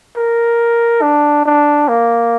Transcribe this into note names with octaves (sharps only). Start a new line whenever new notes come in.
A#4
D4
D4
A#3